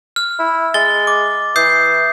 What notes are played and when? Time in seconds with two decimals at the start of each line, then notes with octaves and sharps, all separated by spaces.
0.16 F6
0.39 E4
0.74 G#3 A6 G7
1.07 D6
1.56 E3 D#6 G6 C7